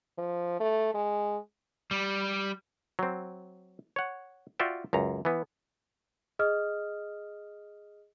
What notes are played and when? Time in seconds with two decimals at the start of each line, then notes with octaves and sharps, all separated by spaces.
0.18 F3
0.60 A3
0.95 G#3
1.91 G3
2.99 F#3 C4
3.96 C#5 F#5
4.59 F4 F#4 D5 E5 G5
4.93 C#2 F#2 A#5
5.25 E3 B3
6.39 G#4 D#5 D#6 F6